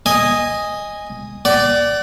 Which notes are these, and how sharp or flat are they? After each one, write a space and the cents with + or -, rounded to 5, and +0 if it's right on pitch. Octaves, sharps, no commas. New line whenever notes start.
D#5 +0 G#5 -15
D5 +0 F#5 +40